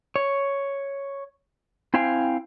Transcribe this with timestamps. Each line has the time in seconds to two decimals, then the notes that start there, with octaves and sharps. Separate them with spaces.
0.16 C#5
1.94 C4 E4 C5 F5 G5 G#5